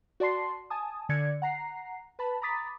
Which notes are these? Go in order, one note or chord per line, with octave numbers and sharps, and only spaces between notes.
F#4 D5 A5 C6 C7
G#5 A5 D#6
D3 D5 G#6 C#7
F#5 A#5 C7
B4 A5 B5
A#5 B5 D6 D#6 A6 B6